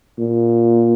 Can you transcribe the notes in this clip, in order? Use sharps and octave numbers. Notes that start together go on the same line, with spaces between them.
A#2